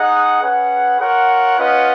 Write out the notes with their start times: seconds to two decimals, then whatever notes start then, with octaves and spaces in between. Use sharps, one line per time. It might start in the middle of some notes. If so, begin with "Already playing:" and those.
Already playing: D#4 G#4 D#5 F#5
0.41 C#4 G#4 B4 F#5
1.00 F4 A#4 C#5 F#5
1.58 C#4 F4 B4 D#5 F#5